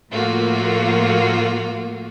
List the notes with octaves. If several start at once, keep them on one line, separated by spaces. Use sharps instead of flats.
A2 F3 A3 A#3 F4 F#4